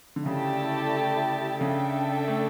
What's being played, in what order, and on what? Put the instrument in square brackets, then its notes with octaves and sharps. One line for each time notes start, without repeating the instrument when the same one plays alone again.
[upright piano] D3
[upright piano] C#3 [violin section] A3 E4 G4 D5 A5
[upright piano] C#3 [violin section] D4 A4 E5 G5
[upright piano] A3